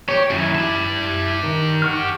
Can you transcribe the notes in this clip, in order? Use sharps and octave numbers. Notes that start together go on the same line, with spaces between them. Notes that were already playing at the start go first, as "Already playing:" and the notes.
G4 C#5
F#2 D#3 E4
G4 A5
D#3
F#5 C#6 F6